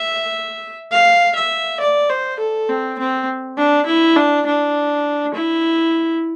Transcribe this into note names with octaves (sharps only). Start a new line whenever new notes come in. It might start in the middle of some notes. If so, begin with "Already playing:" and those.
Already playing: E5
F5
E5
D5
C5
A4
C4
C4
D4
E4
D4
D4
E4